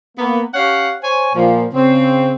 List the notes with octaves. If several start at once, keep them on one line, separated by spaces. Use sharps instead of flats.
A#3 B3
C#4 G4 C#5 F5 F#5
C5 C#5 G#5
A#2 F3
C#3 C4